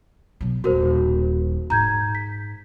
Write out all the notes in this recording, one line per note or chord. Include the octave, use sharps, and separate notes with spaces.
B2 F#3
D#1 F#4 A#4 C5
G#2 A#5 G6 G#6
B6